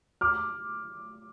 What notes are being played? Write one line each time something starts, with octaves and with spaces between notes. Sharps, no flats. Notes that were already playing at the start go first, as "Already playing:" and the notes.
D6 F6